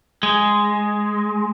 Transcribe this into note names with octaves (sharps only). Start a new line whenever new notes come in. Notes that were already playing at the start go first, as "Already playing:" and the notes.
G#3